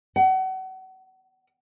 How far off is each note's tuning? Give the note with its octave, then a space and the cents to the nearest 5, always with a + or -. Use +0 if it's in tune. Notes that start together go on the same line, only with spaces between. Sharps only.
F#5 +35